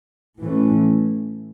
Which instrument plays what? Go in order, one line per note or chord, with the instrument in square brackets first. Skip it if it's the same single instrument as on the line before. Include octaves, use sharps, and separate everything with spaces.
[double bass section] A2 E3 A3 C#4